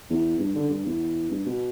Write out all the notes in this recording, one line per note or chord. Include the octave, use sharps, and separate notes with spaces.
E2
G2
D3
G2
E2
G2
B2